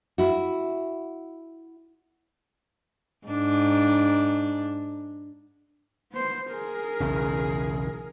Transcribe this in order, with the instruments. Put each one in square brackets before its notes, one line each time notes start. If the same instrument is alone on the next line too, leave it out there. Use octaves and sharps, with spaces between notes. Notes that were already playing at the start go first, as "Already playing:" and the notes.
[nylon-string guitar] E4 F#4
[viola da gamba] G#2 D4
[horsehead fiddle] B3 C5
G#4 A#4
[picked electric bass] B1 E2 C#3